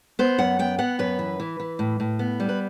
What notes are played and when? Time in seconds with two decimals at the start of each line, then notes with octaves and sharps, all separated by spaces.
0.19 B3 C5
0.38 F#2 F#5
0.59 B3 G5
0.78 B3 F#5
0.99 F#2 B4
1.19 E3
1.40 E3
1.60 E3
1.79 A2
2.00 A2
2.19 B3
2.40 G3
2.49 B4